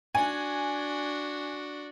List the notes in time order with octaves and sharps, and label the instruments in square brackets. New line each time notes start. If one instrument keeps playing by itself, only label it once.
[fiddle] D4 F#4 [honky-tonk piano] G#5